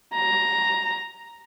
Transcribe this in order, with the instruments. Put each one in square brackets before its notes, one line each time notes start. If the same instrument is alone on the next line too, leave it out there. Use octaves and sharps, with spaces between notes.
[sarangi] A#5